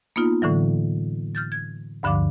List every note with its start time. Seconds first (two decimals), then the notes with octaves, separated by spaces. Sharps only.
0.16 A#3 B3 D#4 F4
0.42 A2 D3 E3 F#3
1.35 F6 G6 A6
1.52 G#6
2.03 D2 G2 D3 F3 F5 D6